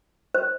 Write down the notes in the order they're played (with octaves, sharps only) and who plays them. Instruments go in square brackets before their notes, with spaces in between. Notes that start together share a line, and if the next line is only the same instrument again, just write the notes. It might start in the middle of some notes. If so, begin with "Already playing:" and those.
[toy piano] C5